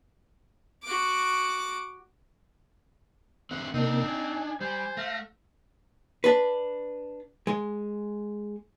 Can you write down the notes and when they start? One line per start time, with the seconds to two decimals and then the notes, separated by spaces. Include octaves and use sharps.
0.84 F#4 D6
3.51 D3 A3 C4 F#5
3.74 C3 A#3 C4 D4 D#4
4.08 G#5
4.61 G3 C5
4.97 A3 F5 A#6
6.24 D4 B4
7.47 G#3